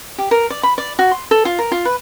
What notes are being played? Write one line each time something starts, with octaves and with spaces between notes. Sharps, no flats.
G4
A#4
D5
B5
D5
F#4
C6
A4
F4
A#4
F4
B4